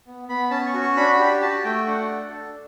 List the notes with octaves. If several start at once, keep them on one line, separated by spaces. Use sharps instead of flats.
B3
B3 B5
C#4 A5
C#6
F#4
C#6
D4 B5
G4
F#4 A5
A3 G5
D4 F#5
A4
D4